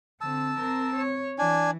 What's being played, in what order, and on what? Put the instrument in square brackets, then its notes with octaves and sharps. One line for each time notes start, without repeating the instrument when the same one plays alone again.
[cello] D3 C4 [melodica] A5 E6
[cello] C4 A#4
C#5
[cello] E3 [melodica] D4 G#5